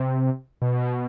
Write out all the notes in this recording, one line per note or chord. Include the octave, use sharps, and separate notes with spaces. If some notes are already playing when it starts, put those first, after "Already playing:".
Already playing: C3
B2